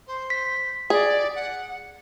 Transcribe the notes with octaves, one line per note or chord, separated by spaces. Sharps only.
C5
B6
G#4 D5
F#5